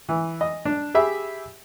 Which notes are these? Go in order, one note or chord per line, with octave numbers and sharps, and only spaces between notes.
E3
D#5
D4
G4 G#4 E5 B5